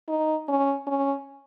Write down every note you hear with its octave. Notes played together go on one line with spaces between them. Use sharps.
D#4
C#4
C#4